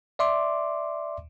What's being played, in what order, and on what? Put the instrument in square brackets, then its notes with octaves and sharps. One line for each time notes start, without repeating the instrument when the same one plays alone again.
[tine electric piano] D5 E5 C6 D6